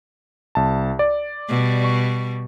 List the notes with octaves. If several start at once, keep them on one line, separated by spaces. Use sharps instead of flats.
C2 A5
D5
B2 G3
C#6